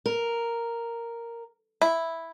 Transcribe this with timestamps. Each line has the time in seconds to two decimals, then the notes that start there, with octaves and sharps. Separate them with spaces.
0.06 A#4
1.82 E4